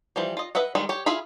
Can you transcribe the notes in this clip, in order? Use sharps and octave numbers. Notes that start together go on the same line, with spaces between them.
E3 F3 G3
F4 D#5
B4 D#5 E5 F#5
D#3 G3 G#3
G4 C#5
E4 F4 G#4 F5 B5